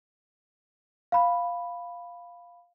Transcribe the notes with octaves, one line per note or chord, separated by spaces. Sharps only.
F5 B5